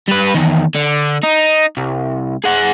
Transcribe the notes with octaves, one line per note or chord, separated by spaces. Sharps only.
G3 B4
E2 D#3
D3
D#4
C2
G#4 F#5